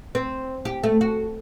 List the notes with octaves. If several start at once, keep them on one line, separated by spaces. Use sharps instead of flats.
C4
G4
A3
F#4